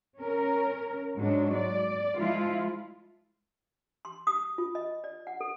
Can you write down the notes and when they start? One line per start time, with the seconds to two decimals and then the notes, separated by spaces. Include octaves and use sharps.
0.19 C#4 A#4
1.16 G#2 F#3 G#3 D4
1.55 D5
2.17 F3 G#3 E4 F4
4.05 C6
4.27 D#6
4.58 F4
4.75 D#5
5.04 D5
5.27 F#5
5.41 A4